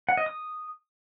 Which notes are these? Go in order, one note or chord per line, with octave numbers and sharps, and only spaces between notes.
F#5
D#5
D#6